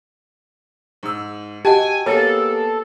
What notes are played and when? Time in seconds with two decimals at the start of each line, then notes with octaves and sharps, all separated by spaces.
1.03 G#2 E6
1.65 F#4 G4 D#5 F#5 G#5 A5
2.06 A#3 B3 G#4 A4 C#5